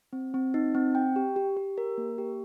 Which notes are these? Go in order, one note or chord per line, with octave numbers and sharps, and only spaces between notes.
C4
C4
D#4
C4
G5
G4
G4
G4
A#4
A#3
G4